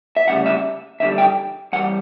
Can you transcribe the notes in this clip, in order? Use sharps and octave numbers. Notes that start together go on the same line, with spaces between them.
E5
D2 C#3 G3 F#5
E5
E2 D3 G3 E5
G5
G2 E3 G3 F#5